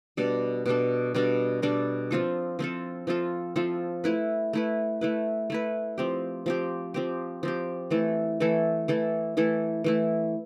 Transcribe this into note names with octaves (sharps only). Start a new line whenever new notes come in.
B2 G3 D4 A4
B2 G3 D4 A4
B2 G3 D4 A4
B2 G3 D4 A4
F3 C4 F4 A4
F3 C4 F4 A4
F3 C4 F4 A4
F3 C4 F4 A4
A3 E4 B4
A3 E4 B4
A3 E4 B4
A3 E4 B4
F3 C4 G4
F3 C4 G4
F3 C4 G4
F3 C4 G4
E3 A3 E4 A4
E3 A3 E4 A4
E3 A3 E4 A4
E3 A3 E4 A4
E3 A3 E4